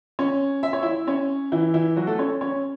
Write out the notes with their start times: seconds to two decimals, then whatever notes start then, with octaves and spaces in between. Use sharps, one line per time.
0.19 C#4 C#5
0.63 E5
0.73 C#5
0.83 E4 E5
1.07 C#4 C#5
1.52 E3 E4
1.74 E3 E4
1.97 F#3 F#4
2.07 A3 A4
2.19 C#4 C#5
2.41 C#4 C#5